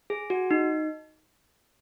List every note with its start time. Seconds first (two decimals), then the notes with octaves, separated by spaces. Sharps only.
0.10 G#4
0.30 F#4
0.51 D#4